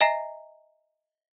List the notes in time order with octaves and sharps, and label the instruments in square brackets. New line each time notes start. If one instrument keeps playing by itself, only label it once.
[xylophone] D#5 E5 G#5 A#5 A#6 C7